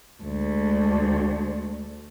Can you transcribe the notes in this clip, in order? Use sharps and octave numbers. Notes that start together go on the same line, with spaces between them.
D2 G#3